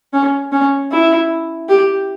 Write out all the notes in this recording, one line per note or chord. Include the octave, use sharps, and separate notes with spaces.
C#4
C#4
E4
G4